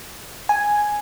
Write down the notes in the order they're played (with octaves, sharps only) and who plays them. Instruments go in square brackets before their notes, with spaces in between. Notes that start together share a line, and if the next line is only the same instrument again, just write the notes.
[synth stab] G#5